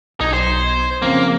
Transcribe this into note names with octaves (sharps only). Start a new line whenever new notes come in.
B1 D#4 G#6
C5
F2 C#3 A#3 C4